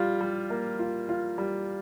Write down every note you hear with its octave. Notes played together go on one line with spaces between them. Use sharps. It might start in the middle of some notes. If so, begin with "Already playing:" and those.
Already playing: G3 F4
G3
A#3
F4
F4
G3